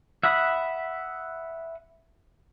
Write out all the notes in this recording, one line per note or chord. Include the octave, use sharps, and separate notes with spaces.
E5 F#5 B5 D#6